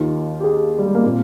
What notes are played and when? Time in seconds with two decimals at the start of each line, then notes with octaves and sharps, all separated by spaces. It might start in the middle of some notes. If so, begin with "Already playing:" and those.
Already playing: D#2 D#3 F4
0.40 G4
0.44 G#4
0.79 G3
0.86 G#3
0.95 A#3
1.03 A#2 C4